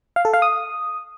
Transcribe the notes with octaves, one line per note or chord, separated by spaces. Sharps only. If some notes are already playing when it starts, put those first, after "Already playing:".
F5
A4
F5
D#6